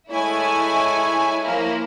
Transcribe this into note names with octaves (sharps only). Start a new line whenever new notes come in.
G#3 A3 E4 C#5 G#5
F3 A#3 E4